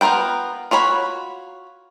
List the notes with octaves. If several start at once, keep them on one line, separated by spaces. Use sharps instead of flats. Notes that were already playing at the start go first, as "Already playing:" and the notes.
B3 F4 A#4 B4 G5
F4 F#4 C#5 B5